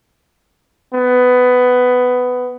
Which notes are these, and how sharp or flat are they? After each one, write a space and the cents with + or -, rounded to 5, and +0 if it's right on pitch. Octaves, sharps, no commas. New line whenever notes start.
B3 +15